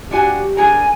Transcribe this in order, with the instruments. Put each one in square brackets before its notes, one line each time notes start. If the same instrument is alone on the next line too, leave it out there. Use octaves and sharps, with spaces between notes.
[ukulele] D4 F#4 G#5 [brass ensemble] G4
[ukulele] D4 G#4 A#4 [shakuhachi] G#5